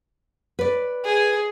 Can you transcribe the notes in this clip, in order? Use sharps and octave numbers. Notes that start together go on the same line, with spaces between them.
B4 D5
G#4